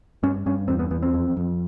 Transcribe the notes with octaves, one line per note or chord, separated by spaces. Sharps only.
G2 C#4
G2 C#4
E2 C4
B3
E2 B3
C4
F2
F2